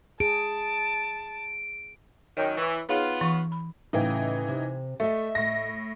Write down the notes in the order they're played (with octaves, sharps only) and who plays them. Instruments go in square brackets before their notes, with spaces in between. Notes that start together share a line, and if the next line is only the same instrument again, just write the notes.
[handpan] G#4 [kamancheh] A5 [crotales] D7
[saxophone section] F#2 D#3 [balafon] C#5 G5
[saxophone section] E3 [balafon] C#6
[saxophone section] B3 F4 [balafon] D#4 G#4 C#5
[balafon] E3 C#6
B5
[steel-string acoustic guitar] A2 C#3 G5 [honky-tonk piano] E3 D#4
[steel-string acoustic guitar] C3
[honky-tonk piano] A3 [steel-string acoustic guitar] A4 D#5 E5
[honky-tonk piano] A2 A#6